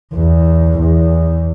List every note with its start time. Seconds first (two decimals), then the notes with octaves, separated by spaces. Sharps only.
0.14 E2
0.79 E2